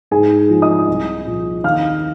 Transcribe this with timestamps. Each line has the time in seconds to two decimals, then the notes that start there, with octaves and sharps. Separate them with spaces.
0.11 G#2 G#4 G#5
0.49 F3
0.62 D#5 D#6
0.88 C2
1.26 A#2 F3
1.64 D#2 F5 F6